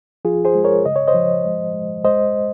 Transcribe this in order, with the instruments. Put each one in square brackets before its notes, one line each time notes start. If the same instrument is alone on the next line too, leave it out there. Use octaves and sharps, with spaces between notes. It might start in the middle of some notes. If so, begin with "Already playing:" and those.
[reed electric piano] F3 F4 G#4
G#4 C5
G#3
A#4 C#5
C#3 D#5
C#5
C5 D#5
F3
G#3
G#3
G#3 C5 D#5